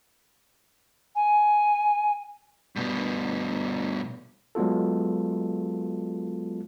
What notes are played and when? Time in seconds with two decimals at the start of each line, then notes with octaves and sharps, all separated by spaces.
1.15 G#5
2.76 G2 B2
4.55 F#3 G#3 B3 F4 A4